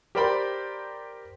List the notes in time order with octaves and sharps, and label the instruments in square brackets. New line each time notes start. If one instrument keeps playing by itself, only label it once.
[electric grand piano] G4 A#4 C5 D5 G5 B5